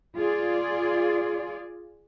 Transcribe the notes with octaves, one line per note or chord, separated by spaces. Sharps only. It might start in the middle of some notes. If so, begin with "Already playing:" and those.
F4 G#4 D5